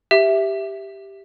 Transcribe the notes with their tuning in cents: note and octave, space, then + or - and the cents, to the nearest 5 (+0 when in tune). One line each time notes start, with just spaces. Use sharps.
G4 +0 E5 +0